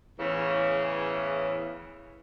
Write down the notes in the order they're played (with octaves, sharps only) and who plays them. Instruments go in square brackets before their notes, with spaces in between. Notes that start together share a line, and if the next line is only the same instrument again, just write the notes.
[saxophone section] E2 A2 C#3 E3